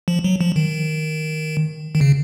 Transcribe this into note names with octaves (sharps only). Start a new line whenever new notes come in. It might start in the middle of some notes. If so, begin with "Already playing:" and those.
F3
F#3
F3
D#3
D#3
C#3